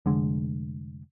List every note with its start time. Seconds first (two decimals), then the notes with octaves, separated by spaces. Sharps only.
0.06 F1 D3 G#3